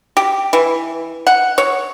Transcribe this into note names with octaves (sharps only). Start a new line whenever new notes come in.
G4
E3
F#5
C#5